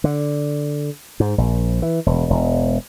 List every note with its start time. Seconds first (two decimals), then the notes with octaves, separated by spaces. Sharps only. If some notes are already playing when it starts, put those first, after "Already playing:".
0.04 D3
1.20 G#2
1.38 A#1
1.82 E3
2.06 E1
2.30 E1